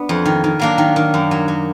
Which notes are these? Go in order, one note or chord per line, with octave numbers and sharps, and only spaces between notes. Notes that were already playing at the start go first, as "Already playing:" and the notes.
Already playing: B3 D4
F2
D#3
D#3
F#3 A#3 D4
D#3
D#3
F#2
F#3
F#3